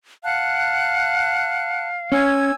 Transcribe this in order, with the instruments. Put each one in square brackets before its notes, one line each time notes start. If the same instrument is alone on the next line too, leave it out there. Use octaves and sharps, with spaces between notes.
[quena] F5 [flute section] F#5 A5 F#6
[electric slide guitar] C#4 [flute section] G#5 E6 G#6